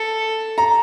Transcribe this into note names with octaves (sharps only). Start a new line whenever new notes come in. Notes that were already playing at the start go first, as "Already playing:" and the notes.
Already playing: A4
A#5